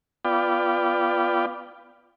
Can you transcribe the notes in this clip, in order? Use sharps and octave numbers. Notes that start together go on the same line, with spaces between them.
B3 F4 D5 G5